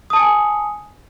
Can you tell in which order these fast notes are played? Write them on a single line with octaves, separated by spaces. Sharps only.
D#6 A5 C#7 G#5